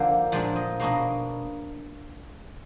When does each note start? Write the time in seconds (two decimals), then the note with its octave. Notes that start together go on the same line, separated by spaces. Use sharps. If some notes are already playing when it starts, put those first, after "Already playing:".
Already playing: D3 F3 A#3 D4 A#4
0.32 A#2 F3 G#3 D4 D5
0.56 D#5
0.80 B2 A#3 D4 D#5